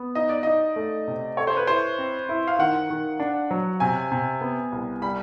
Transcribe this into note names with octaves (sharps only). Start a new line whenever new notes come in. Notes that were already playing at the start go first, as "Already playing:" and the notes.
Already playing: B3
D#4 D#5
D5
D#4 D#5
A3
C3
A4 C#5
C5
B4
E4 C5
C4
E4
F5
D#3 F#5
D#3
D4
F#3
C3 G#5
C3
B3
C2
G3 B5